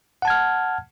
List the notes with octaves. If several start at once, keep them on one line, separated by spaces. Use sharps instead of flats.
F#5 A5 F6 G#6